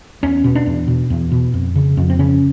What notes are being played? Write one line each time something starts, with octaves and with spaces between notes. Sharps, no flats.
E2 C#4
B2
D4
E2
B2
E2
B2
F2
C#3
F2
C4
C#3 C#4